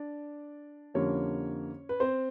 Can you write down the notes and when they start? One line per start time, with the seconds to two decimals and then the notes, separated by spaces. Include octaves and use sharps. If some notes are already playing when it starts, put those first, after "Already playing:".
Already playing: D4 D5
0.94 F2 D3 G3 A#3 C#4 C#5
1.89 B4
2.00 C4 C5